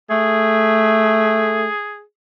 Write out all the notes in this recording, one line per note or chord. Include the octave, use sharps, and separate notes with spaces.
A3 G#4